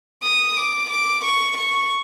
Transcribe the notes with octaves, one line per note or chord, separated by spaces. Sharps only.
D#6
D6
D6
C#6
C#6